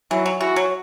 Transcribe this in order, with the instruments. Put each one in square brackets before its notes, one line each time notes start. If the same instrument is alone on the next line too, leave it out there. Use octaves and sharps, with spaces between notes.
[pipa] E3 [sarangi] F#3
[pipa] F#3
[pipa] E3 [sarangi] F#4
[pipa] F#3